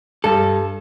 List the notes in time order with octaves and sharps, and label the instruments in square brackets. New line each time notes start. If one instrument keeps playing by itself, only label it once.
[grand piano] G2 [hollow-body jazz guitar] A4